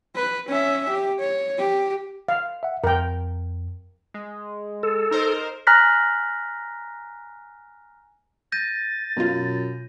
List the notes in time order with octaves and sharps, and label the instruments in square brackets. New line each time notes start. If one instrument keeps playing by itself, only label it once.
[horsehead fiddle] B4
C#4 E5
G4
C#5
G4
[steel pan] F5
[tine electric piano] E5 F#5
[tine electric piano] F2 [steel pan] A#4 G5
[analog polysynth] G#3
[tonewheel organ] A4
[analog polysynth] D#4 A#4 C5
[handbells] G#5 A#5 F6 F#6 A#6 B6
[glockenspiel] G6 A#6 D#7 [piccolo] A6
[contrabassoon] F#2 [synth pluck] B2 F4